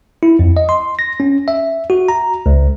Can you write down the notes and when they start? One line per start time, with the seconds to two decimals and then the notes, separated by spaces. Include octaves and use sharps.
0.23 E4
0.39 F2
0.57 D#5
0.69 C6
0.99 A#6
1.20 C#4
1.48 E5
1.90 F#4
2.08 A#5
2.46 C#2